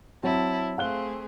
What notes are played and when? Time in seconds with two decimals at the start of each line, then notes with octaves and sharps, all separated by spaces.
0.23 F#3 C4 E4 A5
0.78 A3 C4 G#4 F5 F#6 G7